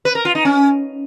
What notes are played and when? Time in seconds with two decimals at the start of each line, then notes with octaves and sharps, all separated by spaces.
0.05 B4
0.15 A#4
0.25 F4
0.35 D#4
0.45 C#4